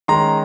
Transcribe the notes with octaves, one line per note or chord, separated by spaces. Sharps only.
D#3 G#3 C#4 A#5 C6